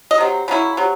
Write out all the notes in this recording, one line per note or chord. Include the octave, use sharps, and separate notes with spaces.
D#5
C3 F#3 C4
C#3 F#3 C#4 E4
C3 F#3